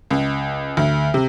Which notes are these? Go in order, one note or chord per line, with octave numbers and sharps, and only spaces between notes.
C#2
D2
C3